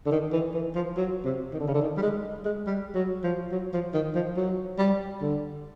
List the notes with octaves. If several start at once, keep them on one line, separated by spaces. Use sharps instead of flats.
D3
D#3
E3
E3
F3
F#3
C3
D#3
D3
C#3
D3
D#3
G3
G#3
G#3
G3
F#3
F3
F#3
F3
D#3
F3
F#3
G3
D3